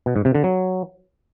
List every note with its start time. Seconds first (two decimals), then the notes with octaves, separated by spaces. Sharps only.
0.06 B2
0.16 G#2
0.25 C3
0.35 D3
0.44 F#3